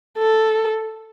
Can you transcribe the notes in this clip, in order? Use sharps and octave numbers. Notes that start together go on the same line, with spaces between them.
A4